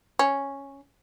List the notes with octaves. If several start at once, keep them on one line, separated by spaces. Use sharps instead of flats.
C#4